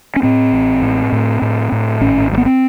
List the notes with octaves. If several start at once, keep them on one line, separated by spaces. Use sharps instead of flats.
C#4
A2 C4
A1
A2
A2
A2
A2
G#1 C#4
G2
B3
C4